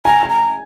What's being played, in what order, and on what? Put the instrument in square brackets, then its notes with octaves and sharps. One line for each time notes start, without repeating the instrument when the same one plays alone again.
[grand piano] G#5 [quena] A#5
[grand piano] G#5
[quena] A#5